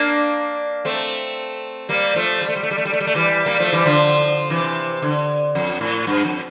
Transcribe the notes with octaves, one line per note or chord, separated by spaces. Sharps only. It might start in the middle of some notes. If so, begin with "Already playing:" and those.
Already playing: A#3 D4
A3 C4
G3 A#3
F3 A3
G3
A3
G3
A3
G3
A3
G3
A3
G3
A3
E3 G3
G3 A#3
F3 A3
E3 G3
D3 F3
C3 E3
D3
F2
A2
G2
F2